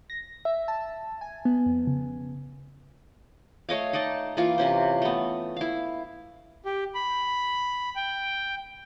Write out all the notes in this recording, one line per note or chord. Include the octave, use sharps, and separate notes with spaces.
A#6
E5
A5
G#5
B3
F2
C#3
A3 C#5 D#5 F5
D#4 D5 D#5 A5
E3 A#3 F4 C#6
C3 C#4 C5
A3 B3
E4 F5
G4
B5
G5